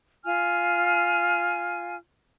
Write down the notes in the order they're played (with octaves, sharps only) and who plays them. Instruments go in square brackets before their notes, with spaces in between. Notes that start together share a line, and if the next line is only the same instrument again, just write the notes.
[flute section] F4 G#5 F6